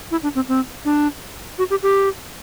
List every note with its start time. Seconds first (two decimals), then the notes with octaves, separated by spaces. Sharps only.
0.11 E4
0.23 D4
0.35 C4
0.49 C4
0.85 D4
1.58 F#4
1.70 G4
1.83 G4